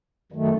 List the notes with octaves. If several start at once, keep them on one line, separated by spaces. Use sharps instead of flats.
F#2 D#3 A3